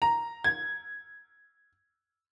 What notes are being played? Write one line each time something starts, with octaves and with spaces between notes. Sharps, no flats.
A#5
G#6